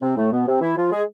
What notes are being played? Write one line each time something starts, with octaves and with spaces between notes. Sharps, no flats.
C3 C4
A2 A3
B2 B3
C3 C4
E3 E4
F3 F4
G#3 G#4